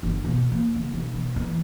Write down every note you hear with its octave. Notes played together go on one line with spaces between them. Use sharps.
G1
B2
A#3
C#3
B1
B2
E3